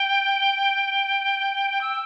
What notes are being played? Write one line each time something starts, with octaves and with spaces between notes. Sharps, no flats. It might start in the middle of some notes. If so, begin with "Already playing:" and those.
Already playing: G5
E6